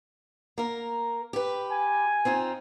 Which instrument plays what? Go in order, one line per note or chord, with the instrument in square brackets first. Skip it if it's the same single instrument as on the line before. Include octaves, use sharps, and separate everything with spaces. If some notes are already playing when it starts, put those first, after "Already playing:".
[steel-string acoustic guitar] A#3 A#4
G4 B4
[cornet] G#5
[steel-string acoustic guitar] C4 D#4 F4